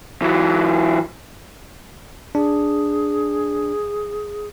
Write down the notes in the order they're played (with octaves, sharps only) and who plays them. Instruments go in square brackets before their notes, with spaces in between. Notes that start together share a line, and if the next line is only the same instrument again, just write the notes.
[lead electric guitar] E3 F#3
[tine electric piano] D4 [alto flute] G#4